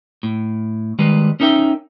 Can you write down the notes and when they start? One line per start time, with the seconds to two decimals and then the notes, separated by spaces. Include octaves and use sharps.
0.23 A2
0.99 D#3 G3 G#3 B4
1.40 C#4 D#4 A#4 E5 G5